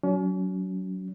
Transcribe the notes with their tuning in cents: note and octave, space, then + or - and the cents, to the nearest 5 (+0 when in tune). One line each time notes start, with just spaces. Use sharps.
F#3 +10 C#4 +40